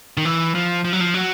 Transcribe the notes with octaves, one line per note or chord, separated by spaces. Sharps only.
D#3
E3
F3
F3
F#3
F3
F#3